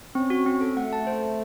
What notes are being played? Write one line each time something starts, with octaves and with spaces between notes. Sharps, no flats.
C4 C#4
F#4
C4
A4
A3 F#5
A5
C5
A5